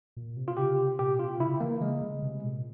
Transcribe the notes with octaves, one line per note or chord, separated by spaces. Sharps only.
A#2
C3
F4
C#3 G4
C3
A#2 G4
C3 F4
C#3 E4
E3 A#3
C#3 G#3
C#3
C3
A#2